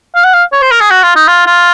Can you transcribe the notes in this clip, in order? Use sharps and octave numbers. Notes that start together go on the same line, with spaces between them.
F5
F#5
F5
C#5
C5
A#4
G#4
F#4
F4
D#4
F4
F4